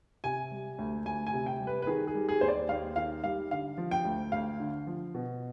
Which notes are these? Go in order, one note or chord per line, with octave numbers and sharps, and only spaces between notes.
C3 G#5
G3
D2
D2 G#5
G#5
C3
G5
G3
B4
B4
D#3 G#4
G#4
G3
G#4
D#2 C5
D5
D#2 F5
D#3 F5
G3 F5
D3 F5
F3
G5
D2
D2 F5
D3
F3
B2